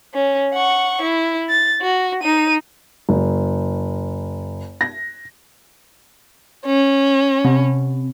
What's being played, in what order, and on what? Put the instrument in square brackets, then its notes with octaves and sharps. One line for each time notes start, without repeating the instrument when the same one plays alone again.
[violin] C#4
F#5 C#6
E4
A6
F#4
D#4 D#7
[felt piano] F#1
A#6
[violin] C#4
[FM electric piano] C3